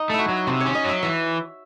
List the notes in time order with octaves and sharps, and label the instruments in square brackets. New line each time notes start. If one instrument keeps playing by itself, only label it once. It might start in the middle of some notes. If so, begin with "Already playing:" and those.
Already playing: [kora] D#4
[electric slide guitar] A3 [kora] E4
[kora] F#4
[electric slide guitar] F#3
[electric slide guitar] C3 [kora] C5
[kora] C#5
[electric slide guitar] C#4
[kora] D#5
[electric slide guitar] F#3 [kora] E5
[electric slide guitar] E3 [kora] E5